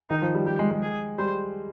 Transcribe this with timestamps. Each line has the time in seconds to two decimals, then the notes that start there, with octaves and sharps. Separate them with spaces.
0.10 D#3 D#4
0.22 F3
0.35 G3
0.46 G3 G4
0.59 G#3
0.71 G#3
0.82 G#4
1.18 G3 C5